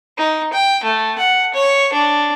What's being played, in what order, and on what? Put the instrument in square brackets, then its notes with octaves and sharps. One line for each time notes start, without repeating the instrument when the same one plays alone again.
[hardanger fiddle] D#4
G5
A3
F#5
C#5
D4